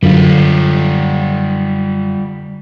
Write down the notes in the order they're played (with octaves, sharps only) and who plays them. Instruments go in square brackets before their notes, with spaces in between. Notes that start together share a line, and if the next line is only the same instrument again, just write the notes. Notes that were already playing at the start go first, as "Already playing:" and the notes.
[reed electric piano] F#2 [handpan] D3 [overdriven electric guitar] G3 F4